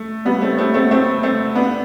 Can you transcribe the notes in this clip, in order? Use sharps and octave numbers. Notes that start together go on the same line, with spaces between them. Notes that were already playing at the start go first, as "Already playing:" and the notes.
Already playing: A3
G3 B3
A3 C4
A3 C4
A3 C4
A3 C4
A3 C4
B3 D4